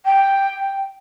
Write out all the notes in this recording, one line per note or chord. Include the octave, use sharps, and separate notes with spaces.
G5